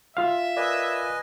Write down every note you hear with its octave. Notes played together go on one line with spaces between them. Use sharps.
F4 E5 F5
A#4 B4 D5 D#5 G#5